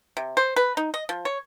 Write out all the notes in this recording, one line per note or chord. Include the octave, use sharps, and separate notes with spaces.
C3
C5
B4
D#4
D#5
F3
C#5